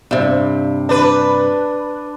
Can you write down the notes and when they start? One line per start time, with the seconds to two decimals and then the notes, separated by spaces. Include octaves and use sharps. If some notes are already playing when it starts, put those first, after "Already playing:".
0.11 G2 C3
0.89 D4 B4